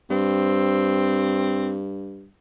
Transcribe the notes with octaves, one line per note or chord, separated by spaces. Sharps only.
G2 C4